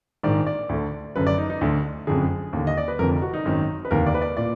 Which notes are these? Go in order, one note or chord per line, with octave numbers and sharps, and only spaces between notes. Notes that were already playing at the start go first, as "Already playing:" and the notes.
A#1 G#2 D#3 D5
D5
D2 D3
F#1 F#2 D3 B4
D5
D#4
D#4
D2 D3
F#1 F2 D3 G#4
D#2 D3
D#5
D5
B4
F1 F2 D3 A#4
F#4
D#4
G#1 F#2 D#3
B4
F1 D#2 D3 A#4
D5
B4
D5
A#2 D5